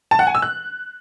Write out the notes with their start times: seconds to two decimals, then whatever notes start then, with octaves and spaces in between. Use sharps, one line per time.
0.11 A5
0.19 F#5
0.27 G#5
0.35 E6
0.42 F#6